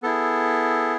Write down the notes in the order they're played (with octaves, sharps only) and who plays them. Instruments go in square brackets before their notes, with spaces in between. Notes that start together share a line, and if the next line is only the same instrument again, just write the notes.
[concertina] B3 E4 G#4 A4